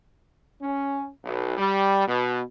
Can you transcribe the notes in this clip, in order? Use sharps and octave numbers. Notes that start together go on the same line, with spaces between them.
C#4
B1
G3
B2